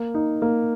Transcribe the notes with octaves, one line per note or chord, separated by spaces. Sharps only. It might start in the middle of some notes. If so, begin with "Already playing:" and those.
Already playing: A#3
D#4
A#3